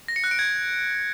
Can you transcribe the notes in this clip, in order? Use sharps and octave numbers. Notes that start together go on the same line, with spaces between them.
A#6
C#7
F#6
D7
G#6